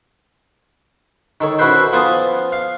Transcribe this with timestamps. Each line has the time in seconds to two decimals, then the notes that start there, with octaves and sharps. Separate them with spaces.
1.41 D#3 A4 C#5
1.59 C#4 E4 F#4 A4 B4 C5
1.92 F3 B3 F4 G#5 A5 D#6
2.52 F5